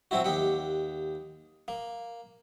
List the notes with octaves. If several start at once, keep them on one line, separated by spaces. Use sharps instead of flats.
F#3 C4 E4 F#4
D#2 G4 F#5
A#3